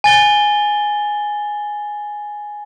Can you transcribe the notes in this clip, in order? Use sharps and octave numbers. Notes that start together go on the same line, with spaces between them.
G#5 A6 G7